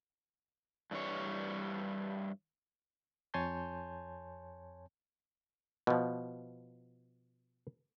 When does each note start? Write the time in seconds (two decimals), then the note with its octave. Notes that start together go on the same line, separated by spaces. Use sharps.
0.91 G2 E3 G3 C#5
3.34 F2 C#5 G#5 A5 C6 G6
5.87 B2 F3